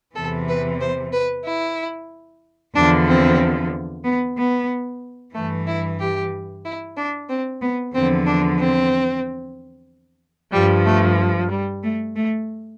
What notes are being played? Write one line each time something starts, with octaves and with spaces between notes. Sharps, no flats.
E2 C3 E3 A4
B4
C5
B4
E4
E2 D3 F3 D4
C4
B3
B3
G2 E3 A3
E4
G4
E4
D4
C4
B3
E2 D3 F3 C4
D4
C4
G2 F3 G3
A3
G3
A3
A3